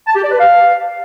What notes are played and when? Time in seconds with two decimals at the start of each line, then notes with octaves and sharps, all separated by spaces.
0.07 A5
0.15 G4
0.23 D5
0.31 B4
0.39 F5